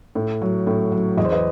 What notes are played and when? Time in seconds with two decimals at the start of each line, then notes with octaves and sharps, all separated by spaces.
0.15 A2
0.42 F#3
0.67 A2
0.92 F#3
1.17 E2 D#5
1.25 C5
1.32 B4 D#5